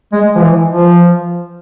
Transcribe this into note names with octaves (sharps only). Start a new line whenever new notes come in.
G#3
F3
E3
F3